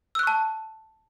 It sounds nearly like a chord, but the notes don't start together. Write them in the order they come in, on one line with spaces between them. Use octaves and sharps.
E6 F#6 C#6 A5